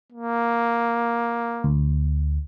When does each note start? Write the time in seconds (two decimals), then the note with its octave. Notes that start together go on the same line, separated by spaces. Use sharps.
0.12 A#3
1.64 D2